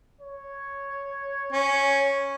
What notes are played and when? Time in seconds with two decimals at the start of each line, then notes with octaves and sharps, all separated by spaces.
0.21 C#5
1.52 C#4